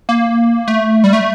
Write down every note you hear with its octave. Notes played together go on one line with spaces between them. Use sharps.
A#3
A3
G3
A3